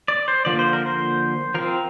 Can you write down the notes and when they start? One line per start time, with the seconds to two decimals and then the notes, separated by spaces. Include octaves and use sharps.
0.08 D5
0.28 C5
0.45 D3 F3 A#3 D5
0.59 C5
0.73 A#4
0.86 C5
1.54 F3 C4 A#4